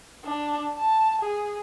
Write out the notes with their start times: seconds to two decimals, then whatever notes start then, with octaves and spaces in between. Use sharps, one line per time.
0.25 D4
0.78 A5
1.21 G#4